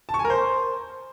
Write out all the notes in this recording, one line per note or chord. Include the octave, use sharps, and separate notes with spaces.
A5
C#6
G#5
A#4
C5